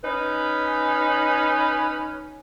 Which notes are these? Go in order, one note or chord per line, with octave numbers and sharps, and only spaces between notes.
C#4 D#4 B4